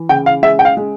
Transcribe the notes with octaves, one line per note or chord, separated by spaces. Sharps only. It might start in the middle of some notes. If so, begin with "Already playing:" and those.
Already playing: E3
C#3 G5
F5
G#3 E5
G5
F5
G#3